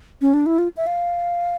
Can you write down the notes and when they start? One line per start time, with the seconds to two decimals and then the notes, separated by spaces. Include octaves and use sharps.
0.21 C#4
0.34 D4
0.46 E4
0.58 F4
0.77 E5
0.87 F5